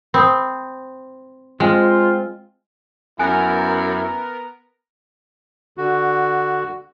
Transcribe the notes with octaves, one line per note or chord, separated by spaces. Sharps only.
C4 B5 D#6
G#3 C4 F4 G5 G#5
F#2 B3 E4 A#4 G#5 F#6
D3 F#4